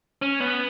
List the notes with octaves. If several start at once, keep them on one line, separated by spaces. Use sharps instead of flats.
C#4
B3